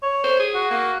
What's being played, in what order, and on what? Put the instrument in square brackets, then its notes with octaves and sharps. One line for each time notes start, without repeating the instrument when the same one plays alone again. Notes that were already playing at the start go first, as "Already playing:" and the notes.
[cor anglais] C#5
[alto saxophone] C5
G#4
[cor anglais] F#4
[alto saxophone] A#3